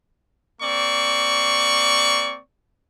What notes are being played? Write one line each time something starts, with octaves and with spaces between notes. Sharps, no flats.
A#3 C4 D5 C#6